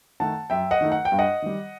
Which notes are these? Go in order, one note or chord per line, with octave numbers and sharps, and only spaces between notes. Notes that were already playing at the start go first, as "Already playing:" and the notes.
D#3 A3 D#4 F#5 A5
F#2 E5 G5
D#5 F#5
D#3 A3 D#4
F#5
G5
G2
D#5 F#5
D#3 G3